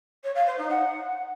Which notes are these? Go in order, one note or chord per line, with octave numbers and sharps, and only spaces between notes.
C#5
F5
C5
D#4
F#5